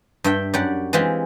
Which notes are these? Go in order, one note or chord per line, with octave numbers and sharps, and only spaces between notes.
G2 E5 G5
F#2 G4 D5 F#5
E3 G#3 C4 F4 G4